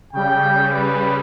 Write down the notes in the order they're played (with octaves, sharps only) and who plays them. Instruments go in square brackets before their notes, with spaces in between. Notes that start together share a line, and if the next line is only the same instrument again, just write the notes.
[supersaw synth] C#3 G3 [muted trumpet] G5
[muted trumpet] B4